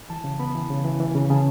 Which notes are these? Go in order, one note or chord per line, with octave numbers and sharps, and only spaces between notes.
E3 A5
C#3
B3 B5
E3
C#3
E3
E3
C#3
C#3 A5